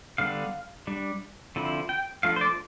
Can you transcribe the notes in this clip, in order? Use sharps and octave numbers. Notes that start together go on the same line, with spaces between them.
D3 G3 B3 D4 F5
G3 D4
D3 F3 C4 E4
G5
F3 A3 D4 F5
C5
D5